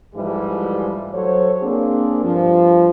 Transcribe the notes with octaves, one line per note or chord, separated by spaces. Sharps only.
G#2 E3 F3 G3 A3
F#3 A4 C5 C#5
A#3 C4 D4 G#4
G2 F3